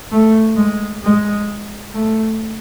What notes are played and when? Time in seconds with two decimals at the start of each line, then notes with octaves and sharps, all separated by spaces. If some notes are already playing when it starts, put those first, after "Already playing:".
0.12 A3
0.57 G#3
1.04 G#3
1.94 A3